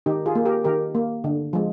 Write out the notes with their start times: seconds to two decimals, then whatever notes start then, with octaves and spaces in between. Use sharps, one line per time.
0.06 D#3 D#4 G4
0.26 F4 G#4
0.35 A#3
0.45 G4 A#4
0.64 D#3 G4 A#4
0.95 A#3
1.24 D3
1.53 F3 G#3